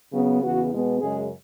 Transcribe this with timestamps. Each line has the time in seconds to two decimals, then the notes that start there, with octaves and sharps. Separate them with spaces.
0.12 C#3 F#3 B3
0.42 E2 C#3 E3 B3 F#4
0.71 B2 G#3 B3
1.00 F#2 C#3 G#3 G#4